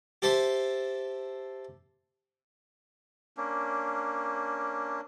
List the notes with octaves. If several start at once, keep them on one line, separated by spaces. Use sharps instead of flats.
G4 A4 C5 E5 C6
A#3 C#4 D4